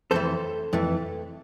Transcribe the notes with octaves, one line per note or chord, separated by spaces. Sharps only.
F2 E3 A3 A4 C5
F2 E3 A3